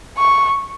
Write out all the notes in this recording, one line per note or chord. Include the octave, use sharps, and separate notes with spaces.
C#6